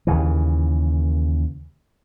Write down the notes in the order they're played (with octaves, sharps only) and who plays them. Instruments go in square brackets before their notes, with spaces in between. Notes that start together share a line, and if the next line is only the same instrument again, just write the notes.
[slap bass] D#2 C#3 E3